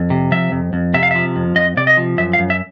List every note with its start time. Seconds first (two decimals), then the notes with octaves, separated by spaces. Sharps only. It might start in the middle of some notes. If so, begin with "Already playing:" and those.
Already playing: F2
0.10 C3
0.32 F3 E5
0.52 F2
0.73 F2
0.94 C3 E5
1.03 F5
1.11 F3 E5
1.36 F2
1.56 F2 D#5
1.77 C3 D5
1.87 D#5
1.97 F3
2.18 F#2 E5
2.33 F5
2.39 F#2
2.50 E5